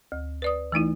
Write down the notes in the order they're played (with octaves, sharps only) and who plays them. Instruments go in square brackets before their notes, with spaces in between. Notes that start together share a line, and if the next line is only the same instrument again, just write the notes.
[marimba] D2
B4 D5 D#6
E3 A3 D#4 E4